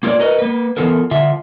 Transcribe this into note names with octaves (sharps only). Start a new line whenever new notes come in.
A#3 F4 A4 A#4 C#5 D5
F#4 A#4 B4 D#5
A#3 B4
E3 F3 B3 F4 A4 A#4
D3 F4 E5